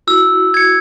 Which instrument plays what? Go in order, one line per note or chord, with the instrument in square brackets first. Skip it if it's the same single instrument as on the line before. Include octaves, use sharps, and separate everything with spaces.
[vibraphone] E4 F#4 [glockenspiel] E6
[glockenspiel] G#6 C#7